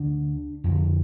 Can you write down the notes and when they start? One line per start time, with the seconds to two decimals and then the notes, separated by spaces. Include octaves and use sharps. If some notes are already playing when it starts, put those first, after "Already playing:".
Already playing: D2 D3 D4
0.64 F2 D3